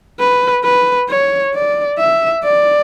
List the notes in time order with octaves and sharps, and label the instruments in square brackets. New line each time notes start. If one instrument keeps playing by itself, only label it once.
[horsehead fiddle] B4
B4
C#5
D5
E5
D5